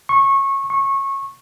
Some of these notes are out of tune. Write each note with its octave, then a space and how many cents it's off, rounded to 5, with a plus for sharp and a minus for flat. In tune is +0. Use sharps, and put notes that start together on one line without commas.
C#6 -20
C#6 -20